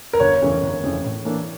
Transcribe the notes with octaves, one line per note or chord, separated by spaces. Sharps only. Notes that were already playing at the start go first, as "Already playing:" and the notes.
A#4
G1 C#5
F2 C#3 E3 A3
G1
F2 C#3 E3 A3
A2
E3 A#3 D4 A4